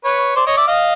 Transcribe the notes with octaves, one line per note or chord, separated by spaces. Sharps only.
B4 C#5
C5 D5
C#5 D#5
D5 E5
D#5 F5